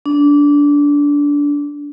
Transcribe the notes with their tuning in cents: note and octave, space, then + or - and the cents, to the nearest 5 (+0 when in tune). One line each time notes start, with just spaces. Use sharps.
D4 -20